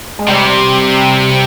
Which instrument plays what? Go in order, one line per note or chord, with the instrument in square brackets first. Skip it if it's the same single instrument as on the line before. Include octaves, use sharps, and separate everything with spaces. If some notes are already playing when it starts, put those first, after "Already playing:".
[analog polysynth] G#3
[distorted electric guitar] C3 [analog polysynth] G3